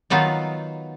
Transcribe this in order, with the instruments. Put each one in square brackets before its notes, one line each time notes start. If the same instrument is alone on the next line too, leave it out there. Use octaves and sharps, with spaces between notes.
[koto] D#3 F#3 B3 D#4 F4